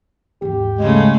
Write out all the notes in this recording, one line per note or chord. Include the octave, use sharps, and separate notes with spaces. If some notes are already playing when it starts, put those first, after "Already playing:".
D#2 G#2 G4
C#3 G#3 A3